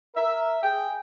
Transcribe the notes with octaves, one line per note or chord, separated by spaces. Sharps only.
A#4 E5
G#4 G5